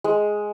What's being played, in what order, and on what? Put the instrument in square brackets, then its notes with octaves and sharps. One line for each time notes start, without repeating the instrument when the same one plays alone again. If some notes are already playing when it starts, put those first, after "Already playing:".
[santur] G#3